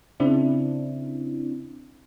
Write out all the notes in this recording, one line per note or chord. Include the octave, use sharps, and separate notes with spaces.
C#3 C4 D4 E4